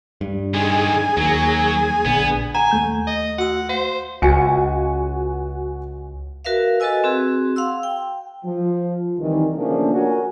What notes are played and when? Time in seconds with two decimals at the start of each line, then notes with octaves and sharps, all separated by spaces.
0.21 G2
0.54 D3 D#3 G#4
1.17 D#2 F#3
2.06 A#1 D3 B3
2.55 F#5 G#5 A#5
2.71 D#2 A3 G6
3.07 D#5
3.38 F#4 F#5 E6
3.69 C5 F5
4.22 C#2 F#4 G#5 C#7
6.45 F#4 A#4 B4 E5 F5
6.80 F#4 A4 B4 D#5 G#5 E6
7.04 C4 F#4 G#4
7.56 F5 F#5 C6 E6
7.83 G5
8.45 F3
9.19 C2 D#3 E3
9.56 C#3 F3 A3 A#3 C#4 D4
9.93 F#4 A#4 C#5 F#5 G#5